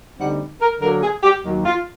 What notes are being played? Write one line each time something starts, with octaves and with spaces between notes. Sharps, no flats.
D2 D3 G3 C4 D#4 F#5
A#4
D3 F#3 A#3 A#4
G#4
G4
D#2 D#3 F#3
F4